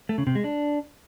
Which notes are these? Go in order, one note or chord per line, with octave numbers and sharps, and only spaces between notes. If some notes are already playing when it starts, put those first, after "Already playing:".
A3
C#3
C3
G#3
D4